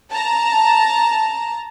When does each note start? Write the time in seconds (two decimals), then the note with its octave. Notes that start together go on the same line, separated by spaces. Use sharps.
0.12 A5 A#5